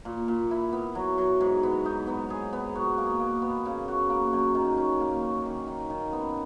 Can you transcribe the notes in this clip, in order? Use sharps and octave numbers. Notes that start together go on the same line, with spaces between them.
A#2
A#2
E4
B3
F#3
F#3
G#2
B3
D#4
B3
G#4
B3
F#4
A#3
A#3
B3
C#3
F#4
A#3
F#2
D#3
C#4
A#3
C#4
D#3
D#3
D#3
B3